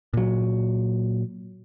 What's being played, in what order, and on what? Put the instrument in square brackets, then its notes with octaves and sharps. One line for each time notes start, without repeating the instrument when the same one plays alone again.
[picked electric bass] A#2 F#3